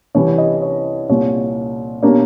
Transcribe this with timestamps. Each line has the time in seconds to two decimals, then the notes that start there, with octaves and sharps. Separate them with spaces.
0.15 C2 C3 E3 G3 C#5
0.38 D#5
0.62 C#5
1.09 C2 A#2 G3 C#5
2.02 B2 G3 A#3 D4 C#5